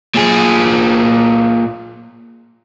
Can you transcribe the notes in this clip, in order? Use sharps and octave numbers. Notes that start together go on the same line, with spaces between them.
A#2 G#4